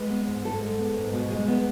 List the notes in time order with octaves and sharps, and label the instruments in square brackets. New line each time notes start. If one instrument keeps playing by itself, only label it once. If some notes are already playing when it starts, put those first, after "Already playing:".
Already playing: [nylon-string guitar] G#3 B4
B3
G#2
G#2 A4
G#3
B3
G#2
B2
G#3
B3